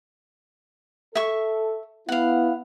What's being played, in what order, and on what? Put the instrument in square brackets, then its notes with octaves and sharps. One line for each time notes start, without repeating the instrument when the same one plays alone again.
[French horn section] A4 [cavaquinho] E5 C#6
[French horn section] B3 E4 [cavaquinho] F5 F#5